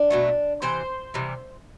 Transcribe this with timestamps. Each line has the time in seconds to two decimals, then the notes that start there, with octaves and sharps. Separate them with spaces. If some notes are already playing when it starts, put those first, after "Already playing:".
Already playing: D4
0.10 B2 F#3 A3
0.62 C3 E3 C5
1.14 C3 E3 G3